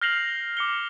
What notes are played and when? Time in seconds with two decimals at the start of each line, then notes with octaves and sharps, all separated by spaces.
0.01 F6 G6 A#6 C7 F7 F#7
0.57 D6 C#7 G7